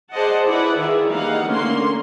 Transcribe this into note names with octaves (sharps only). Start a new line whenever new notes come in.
G#4 C5 D5 D#5 F#5 A5
E4 G#4 B4 D5 F#5
D#3 F4 G#4 E5
E3 G3 A#3 D#4 F5 F#5
D3 A3 A#3 C#4 A#4 C6